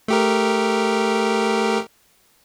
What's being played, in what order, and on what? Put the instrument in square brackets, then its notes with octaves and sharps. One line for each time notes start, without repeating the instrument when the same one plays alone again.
[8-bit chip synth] A3 G4 A#4